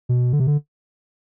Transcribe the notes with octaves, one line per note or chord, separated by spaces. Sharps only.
B2
D3
C3
D3